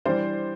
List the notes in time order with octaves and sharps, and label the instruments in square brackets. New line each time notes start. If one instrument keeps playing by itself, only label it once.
[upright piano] E3 G3 D4 C5